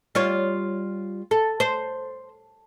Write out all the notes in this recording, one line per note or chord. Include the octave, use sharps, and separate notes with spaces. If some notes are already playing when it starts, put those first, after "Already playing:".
G3 F4 C#5
A4
C5